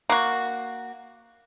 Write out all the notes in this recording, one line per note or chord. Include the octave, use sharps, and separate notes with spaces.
A#3 F#4